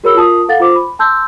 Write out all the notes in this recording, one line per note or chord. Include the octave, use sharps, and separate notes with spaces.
F#4 G#4 A#4 C#5 B5 E6
F4 A#4 A5 D#6
A4 F5 F#5 A6
F4 C5 D6
B5
A5 C6 E6 G6